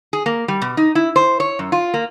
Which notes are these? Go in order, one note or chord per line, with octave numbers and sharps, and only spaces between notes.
G#4
A#3
G3
B2
D#4
E4
C5
C#5
F#2
F4
A#3